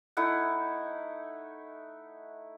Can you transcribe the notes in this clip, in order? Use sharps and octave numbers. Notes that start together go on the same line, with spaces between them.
A3 D#4 E4 F#5